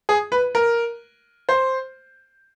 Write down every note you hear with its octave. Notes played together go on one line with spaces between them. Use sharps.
G#4
B4
A#4
C5